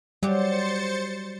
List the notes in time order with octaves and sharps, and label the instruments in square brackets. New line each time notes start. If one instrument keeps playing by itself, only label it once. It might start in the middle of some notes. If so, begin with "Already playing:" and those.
[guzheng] F#3 G4 [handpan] G3 [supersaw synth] C5 A6 C#7